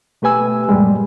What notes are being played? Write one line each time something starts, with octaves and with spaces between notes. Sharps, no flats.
B2 A3 G4 B4 G#5 E6
F#2 A#2 G3 G#3